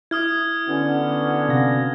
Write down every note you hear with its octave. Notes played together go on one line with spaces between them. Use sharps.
E4 D#6 F6 G#6
D3 B3 C#4 F#4
C3 F5 A#6